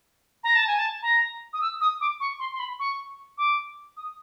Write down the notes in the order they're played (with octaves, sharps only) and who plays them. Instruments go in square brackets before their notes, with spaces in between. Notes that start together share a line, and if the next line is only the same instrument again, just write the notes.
[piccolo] A#5
A5
G#5
A5
A#5
D#6
E6
D#6
D6
C#6
C6
C6
B5
C#6
D6
D#6